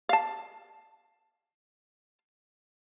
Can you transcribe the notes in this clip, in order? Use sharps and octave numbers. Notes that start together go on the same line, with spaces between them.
F5 A5